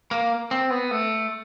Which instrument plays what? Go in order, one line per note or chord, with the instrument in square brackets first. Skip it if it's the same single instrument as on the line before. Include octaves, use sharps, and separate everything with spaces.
[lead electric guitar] A#3
C4
B3
A3